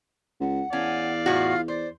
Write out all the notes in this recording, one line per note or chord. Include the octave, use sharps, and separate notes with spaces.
C#2 F#5
E2 C#4 D5 F5
A2 F4 F#4
C5 D5